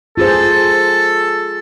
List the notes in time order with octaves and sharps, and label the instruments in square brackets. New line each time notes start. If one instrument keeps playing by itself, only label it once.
[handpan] F4 G#4 C5 [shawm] A4